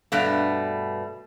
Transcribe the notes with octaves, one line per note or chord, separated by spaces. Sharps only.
G2 B2 A3